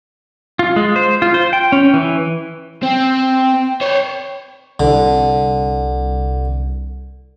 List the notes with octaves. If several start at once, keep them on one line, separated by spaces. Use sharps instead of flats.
F4
G#3
C5
F4
C5
G5
C#4
E3
C4 G5
C5 C#5
C2 D3